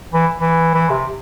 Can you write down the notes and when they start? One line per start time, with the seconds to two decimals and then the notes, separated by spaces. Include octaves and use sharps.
0.13 E3
0.39 E3
0.74 E3
0.90 C3